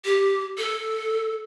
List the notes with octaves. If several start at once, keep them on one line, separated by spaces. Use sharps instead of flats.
G4
A4